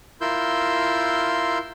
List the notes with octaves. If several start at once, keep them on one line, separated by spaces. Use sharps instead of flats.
E4 F4 A#4 C6 E6 G6